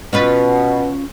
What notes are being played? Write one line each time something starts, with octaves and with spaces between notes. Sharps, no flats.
B2 C#4 F4 B4